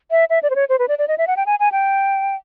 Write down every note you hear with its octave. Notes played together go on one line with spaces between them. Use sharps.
E5
E5
D5
C5
C#5
C5
B4
D5
D5
D#5
E5
F#5
G5
G#5
G#5
G5